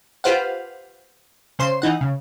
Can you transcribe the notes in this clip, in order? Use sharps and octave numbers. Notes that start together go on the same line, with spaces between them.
F4 G4 B4 C5 F5 F#5
C#3 C5 C6
E3 D#4 F#5
C#3